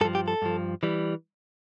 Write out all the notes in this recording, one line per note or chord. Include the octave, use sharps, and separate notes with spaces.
G2 F3 A4
G4
A4
G2 F3
E3 G3